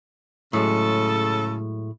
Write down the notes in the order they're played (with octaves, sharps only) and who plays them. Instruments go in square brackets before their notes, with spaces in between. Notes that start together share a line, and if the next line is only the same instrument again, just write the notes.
[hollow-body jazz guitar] A2 F#3 G#3 [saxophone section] C#3 A4